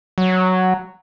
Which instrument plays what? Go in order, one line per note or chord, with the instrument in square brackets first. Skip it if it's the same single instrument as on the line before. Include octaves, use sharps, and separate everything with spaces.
[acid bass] F#3